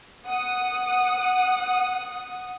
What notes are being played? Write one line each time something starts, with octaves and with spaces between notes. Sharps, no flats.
F#5 D#6